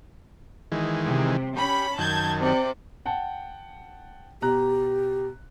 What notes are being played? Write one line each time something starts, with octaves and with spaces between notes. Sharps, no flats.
D#3 E3 G#3
C3
C#4 G4 B5
F#2 D#3 A5 G6 G#6
C3 D5
F#5 G5 A5
B2 G4 A#5 F#6